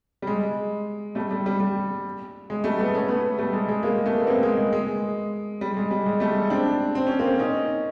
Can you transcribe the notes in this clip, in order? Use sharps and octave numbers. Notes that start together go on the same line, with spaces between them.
G3
G#3
G3 A3
G3
G3
G3
G#3
G3 A3
A3 B3
B3 C#4
A3 B3
G3 A3
G#3
G#3
G#3 A#3
A3
A#3
B3
A#3 C4
G#3
G#3
G#3
G3
G#3
G3
G#3
G3 A3
C4 D4
C4
C#4
A#3 C4
C#4 D#4